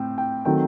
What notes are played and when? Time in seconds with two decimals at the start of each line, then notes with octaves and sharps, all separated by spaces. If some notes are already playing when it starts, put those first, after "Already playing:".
Already playing: A2 C4 G5
0.18 G5
0.45 D#3 F#3 A3 C4 G5